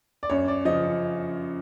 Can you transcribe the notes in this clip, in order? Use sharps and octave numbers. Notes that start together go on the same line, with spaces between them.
D5
F#2 C#5
D5
C#3 F3 D#5